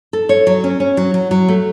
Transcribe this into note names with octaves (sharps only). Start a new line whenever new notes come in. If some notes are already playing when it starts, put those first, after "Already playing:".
A4
C#5
F#3
C#4
C#4
F#3
F#3
F#3
A3